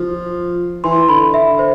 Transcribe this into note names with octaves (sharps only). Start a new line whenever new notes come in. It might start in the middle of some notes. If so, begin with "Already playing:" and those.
Already playing: F3
E3 C6
D3 B5
E5
C5